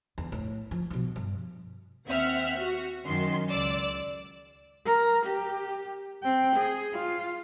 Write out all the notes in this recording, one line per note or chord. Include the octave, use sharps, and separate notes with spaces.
E2
A2
F3
B2 F3
G2
D#2 C4 E5 F#5 F6
F#4
F#2 D#3 C6
C#2 D5 E6
A#4
G4
C4 G5
G#4
F4